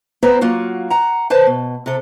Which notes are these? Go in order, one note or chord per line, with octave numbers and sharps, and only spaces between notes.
B3 C4 E4 B4 C5 A#5
F#3 A#3 F4 F#4
F#5 A#5
B4 C5 A5
B2
C3 A4